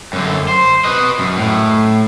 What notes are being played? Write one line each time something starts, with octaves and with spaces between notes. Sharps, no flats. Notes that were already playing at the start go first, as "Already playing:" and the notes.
F#2 D3
C5
B4 D#5
F#2
A2